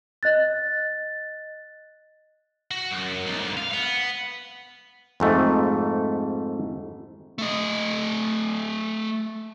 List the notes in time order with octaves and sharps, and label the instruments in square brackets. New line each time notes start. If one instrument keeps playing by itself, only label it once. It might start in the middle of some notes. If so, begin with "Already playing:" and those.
[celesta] D#5 F#6 A6
[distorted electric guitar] F#4
F#2
B1
G#2 D3
F5
B3
[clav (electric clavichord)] F2 G#2 A3
[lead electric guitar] A3 D#5